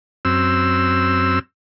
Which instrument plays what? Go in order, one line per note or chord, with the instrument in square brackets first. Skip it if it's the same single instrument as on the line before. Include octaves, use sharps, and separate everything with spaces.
[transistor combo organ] F#2 C4 E6